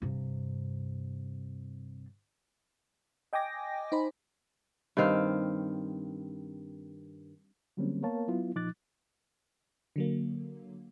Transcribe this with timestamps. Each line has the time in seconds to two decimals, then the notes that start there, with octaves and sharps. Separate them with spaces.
0.02 G2 C3
3.33 D#5 G5 G#5 D6 A#6
3.92 D#4 C5 B5
4.97 G2 D#3 C4 F5
7.77 D3 F#3 G3 A#3 C4 C#4
8.03 A#3 B3 A#4 C#5 F5 A5
8.28 F#3 B3 E4 F4
8.55 A#2 F3 D#4 D6 F#6 A6
9.96 D3 F#3 A#3